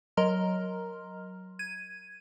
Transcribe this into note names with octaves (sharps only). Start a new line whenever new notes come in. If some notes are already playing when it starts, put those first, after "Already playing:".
F#3 A#4 D#5 A#5 C6 F6
G#6 D#7